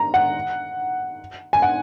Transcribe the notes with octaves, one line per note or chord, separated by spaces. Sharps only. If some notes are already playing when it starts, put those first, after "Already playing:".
Already playing: A#5
F#5
G#5
F#5